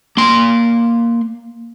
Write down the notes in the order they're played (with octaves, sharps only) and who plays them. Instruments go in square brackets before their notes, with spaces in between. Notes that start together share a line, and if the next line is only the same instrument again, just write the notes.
[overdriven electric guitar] A#3 C6